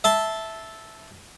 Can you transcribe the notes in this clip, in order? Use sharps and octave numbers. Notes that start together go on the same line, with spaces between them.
E5 A5 C6